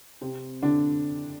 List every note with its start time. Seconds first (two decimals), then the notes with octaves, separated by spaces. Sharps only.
0.21 C3 C4
0.62 D3 D4